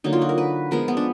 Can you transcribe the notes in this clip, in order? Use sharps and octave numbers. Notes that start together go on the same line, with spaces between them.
D3 F#3 A#3 D#4
F4
F#4
A#4
B4
F3 G#3 B3 A#4
B3
D4